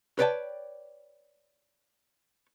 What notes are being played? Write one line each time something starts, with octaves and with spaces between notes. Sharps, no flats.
B4 C#5 D5 G5 A5